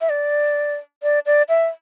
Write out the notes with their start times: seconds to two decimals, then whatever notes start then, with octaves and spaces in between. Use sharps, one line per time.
0.01 E5
0.10 D5
1.03 D5
1.26 D5
1.49 E5